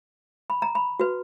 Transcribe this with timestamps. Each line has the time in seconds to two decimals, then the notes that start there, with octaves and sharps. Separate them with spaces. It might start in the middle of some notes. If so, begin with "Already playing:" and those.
0.50 B5
0.62 A#5
0.75 B5
1.00 F#4 B4